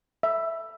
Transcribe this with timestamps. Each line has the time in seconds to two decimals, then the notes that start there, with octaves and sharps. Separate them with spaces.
0.23 E5